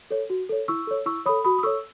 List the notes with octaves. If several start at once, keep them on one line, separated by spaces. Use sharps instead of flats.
A4 C#5
F#4
A4 C#5
E4 C#6 E6
A4 C#5
E4 C#6 E6
A4 C#5 B5 D#6
F#4 B5 D#6
D#6
A4 C#5 C#6 E6